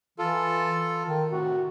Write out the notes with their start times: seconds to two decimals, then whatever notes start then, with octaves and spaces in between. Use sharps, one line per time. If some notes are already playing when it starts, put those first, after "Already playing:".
0.18 E3 F4 A4
1.06 D#3
1.31 A2 C3 F#4